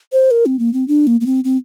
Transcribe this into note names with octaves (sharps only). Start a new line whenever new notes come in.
C5
A#4
C4
A#3
C4
D4
A#3
A#3
C4
C4